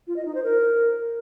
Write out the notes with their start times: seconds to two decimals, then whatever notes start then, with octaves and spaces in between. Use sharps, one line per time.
0.07 F4
0.16 D#5
0.25 D#4
0.35 C5
0.44 A#4